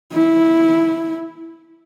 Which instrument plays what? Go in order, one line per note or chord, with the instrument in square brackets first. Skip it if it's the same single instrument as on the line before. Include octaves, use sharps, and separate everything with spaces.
[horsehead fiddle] E4